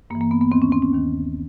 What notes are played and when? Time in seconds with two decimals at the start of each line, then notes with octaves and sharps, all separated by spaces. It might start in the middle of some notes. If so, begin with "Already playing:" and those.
0.10 G2 A#3
0.15 E3
0.21 A#3
0.31 B3
0.41 B3
0.52 D#2 D#3 C4
0.62 C#4
0.72 C4
0.82 C#4
0.92 D#2 D#3